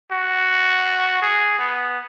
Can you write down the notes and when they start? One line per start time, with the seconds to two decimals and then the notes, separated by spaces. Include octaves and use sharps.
0.11 F#4
1.22 G#4
1.58 B3